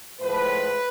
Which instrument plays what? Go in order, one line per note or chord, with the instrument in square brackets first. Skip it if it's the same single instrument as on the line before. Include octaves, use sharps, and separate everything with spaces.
[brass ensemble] A2 F3 G#3 B4